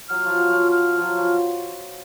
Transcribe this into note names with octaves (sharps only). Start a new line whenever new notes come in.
F#3 F6
F3
F#3
F3
F6
F3
F#3
F3